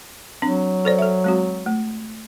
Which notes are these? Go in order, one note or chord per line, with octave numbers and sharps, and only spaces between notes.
F#3 C4 D4
A4 C5 D5
A4 E5
G#3 C4 F#4
A3